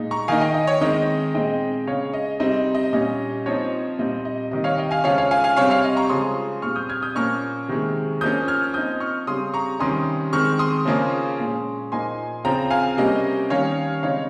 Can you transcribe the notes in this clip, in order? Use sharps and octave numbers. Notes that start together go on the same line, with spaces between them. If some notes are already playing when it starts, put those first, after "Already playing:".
Already playing: A#2 G#3 D#4
A#5 C#6
D#3 A#3 D#4 F5 G#5
D#5 G5
D#5
C#5
D#3 G#3 C4 D#4 D#5
A#2 G#3 C4 D#4 D#5 G5
C#3 G#3 C#4 C#5 F5
D#5
C3 G3 C4 D#4 D#5
D#5
A#2 G3 C#4 D#5
F3 C4 D#4 C#5
A#2 G3 C4 D#4 D#5
D#5
C3 D#3 G3 D#5
C#5 F5
D#5 G5
F5 G#5
C#3 F3 G#3 C#4 C#5 F5
C#5 F5
F5 G#5
F5 G#5
C3 G3 C4 C#5 F5
C#5 F5
D#5
A#5 C#6
C#3 F3 G#3 C6 D#6
A#2 G3 C4 C#6 F6
D#6 G6
F6 G#6
D#6 G6
A#2 F3 A#3 C#4 C#6 F6
C3 D#3 G#3
F3 A#3 C#4 D#6 G6
F6 G#6
F3 C4 D#4 D#6 G6
C#6 F6
C#3 G3 C4 C6 D#6
A#5 C#6
C3 D#3 G3 C#4 C6 D#6
D#3 G#3 C4 C#6 F6
C6 D#6
C#3 F3 A#3 C#4
A#2 G#3 C#4
A#2 F3 A#3 D#4 G#5 C6
C#3 F3 C4 G5 A#5
F5 G#5
C3 G3 A#3 C#4 D#5
D#3 G3 C#4 C#5 F5
C#3 G#3 C4 D#4 C#5 F5